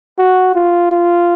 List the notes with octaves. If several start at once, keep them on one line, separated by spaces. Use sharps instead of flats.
F#4
F4
F4